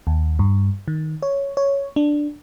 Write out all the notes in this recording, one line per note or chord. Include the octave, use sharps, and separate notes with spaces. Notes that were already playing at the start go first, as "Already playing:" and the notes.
D#2
G2
D#3
C#5
C#5
D4